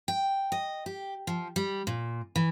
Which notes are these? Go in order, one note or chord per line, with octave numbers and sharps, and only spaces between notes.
G5
D#5
G4
F3
G3
A#2
E3